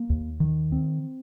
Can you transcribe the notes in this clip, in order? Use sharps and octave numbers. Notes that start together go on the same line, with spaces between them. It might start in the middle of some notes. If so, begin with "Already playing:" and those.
Already playing: A#3
D#2
D#3
C4